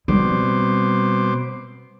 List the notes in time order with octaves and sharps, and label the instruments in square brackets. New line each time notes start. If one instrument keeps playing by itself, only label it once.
[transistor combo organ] B2 C5 D6 [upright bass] G3 C4